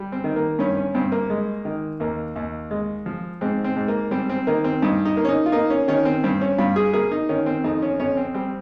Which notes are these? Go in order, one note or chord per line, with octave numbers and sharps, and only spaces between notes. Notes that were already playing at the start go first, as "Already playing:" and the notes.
Already playing: G3
C4
D#3
A#3
G2 C#4
C#4
G2 C4
A#3
G#3
D#3
D#2 A#3
D#2
G#3
F3
G#2 C4
C4
G#2
A#3
G3 C4
C4
D#3 A#3
C4
G2 D#4
D#4
A#3
C#4
D#4
F4
A#3 D#4
C#4
D#3 C#4
C4
G2 C4
C#4
G2 F4
G#4
A#3 G#4
D#4
D#3 C#4
C4
F2 D#4
C#4
F2 C#4
C4
G3 C4